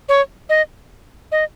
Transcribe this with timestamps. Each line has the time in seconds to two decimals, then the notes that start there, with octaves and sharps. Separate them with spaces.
0.09 C#5
0.49 D#5
1.32 D#5